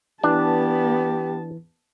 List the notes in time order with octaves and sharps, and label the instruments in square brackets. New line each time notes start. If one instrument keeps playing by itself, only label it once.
[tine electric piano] E3 [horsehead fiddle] B3 A5 [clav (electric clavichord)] D4 [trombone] G4